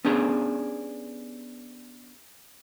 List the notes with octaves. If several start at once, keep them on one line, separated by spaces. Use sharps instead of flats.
B3 C#4 D4 G4 G#4